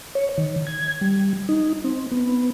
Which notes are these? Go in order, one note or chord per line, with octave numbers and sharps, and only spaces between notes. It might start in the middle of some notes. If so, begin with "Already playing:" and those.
C#5
D#3
G#6
G3
D#4
C4
B3